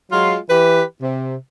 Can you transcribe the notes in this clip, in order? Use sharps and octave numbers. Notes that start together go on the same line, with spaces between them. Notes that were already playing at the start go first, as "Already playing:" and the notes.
F#3 G#3 F4
E3 G4 B4
C3